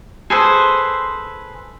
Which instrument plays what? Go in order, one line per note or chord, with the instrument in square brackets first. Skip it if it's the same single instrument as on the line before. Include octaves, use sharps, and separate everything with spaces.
[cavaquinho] G#4 A4 B4 C5